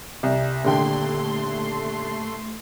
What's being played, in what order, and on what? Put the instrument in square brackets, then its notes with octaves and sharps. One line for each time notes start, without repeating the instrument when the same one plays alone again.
[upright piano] C2
[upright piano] D#1 D3 G5 [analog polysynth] A3 C6